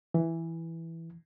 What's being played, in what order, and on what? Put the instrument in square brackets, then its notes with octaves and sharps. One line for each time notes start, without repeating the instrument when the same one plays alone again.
[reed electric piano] E3